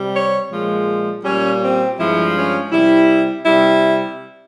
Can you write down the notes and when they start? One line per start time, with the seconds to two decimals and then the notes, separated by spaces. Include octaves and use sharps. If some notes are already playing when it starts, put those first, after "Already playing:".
Already playing: C3 G3
0.15 C#5
0.51 A#2 F3 G#3
1.24 A#2 G3 C#4
1.61 C4
1.98 G2 F3 G#3 E4
2.35 C#4
2.71 C3 G3 E4
3.44 C3 G3 E4